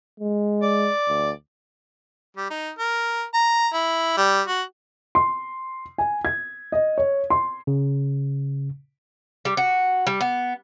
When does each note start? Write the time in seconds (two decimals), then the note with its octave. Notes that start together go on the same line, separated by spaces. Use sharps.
0.20 G#3
0.62 D5
1.08 D2
2.37 G3
2.50 D#4
2.79 A#4
3.34 A#5
3.74 E4
4.17 G3
4.47 F#4
5.15 C6
5.98 G#5
6.25 G#6
6.72 D#5
6.98 C#5
7.30 C6
7.67 C#3
9.45 G3
9.57 F#4
10.07 G3
10.21 B3